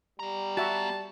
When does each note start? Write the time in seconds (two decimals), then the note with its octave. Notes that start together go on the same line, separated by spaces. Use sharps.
0.19 G3 B3 A#5
0.57 F#4 E5 A5